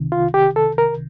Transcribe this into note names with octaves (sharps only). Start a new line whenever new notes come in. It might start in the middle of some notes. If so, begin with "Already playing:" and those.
Already playing: C2 C3 D#3
F4
G4
A4
A#4